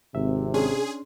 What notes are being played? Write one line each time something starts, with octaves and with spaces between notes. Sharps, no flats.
G#1 C3 E5
C#4 D4 G#4 C6